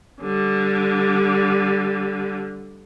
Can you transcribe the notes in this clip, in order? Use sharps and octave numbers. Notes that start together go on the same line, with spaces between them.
D3 G3